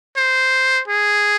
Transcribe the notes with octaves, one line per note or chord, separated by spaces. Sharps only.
C5
G#4